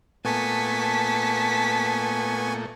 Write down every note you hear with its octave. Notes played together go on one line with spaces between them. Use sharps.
A#2 A3 B3 G#5 A5 C#6 B6